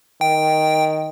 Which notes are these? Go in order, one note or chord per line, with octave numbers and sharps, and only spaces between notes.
D#3 G5